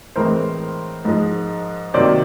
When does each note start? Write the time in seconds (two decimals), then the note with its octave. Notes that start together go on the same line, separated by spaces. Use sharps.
0.16 A2 E3 G#3 C4 A#4 C5
1.05 G#2 F3 G#3
1.94 C3 D#3 F#3 A#3 C5 D5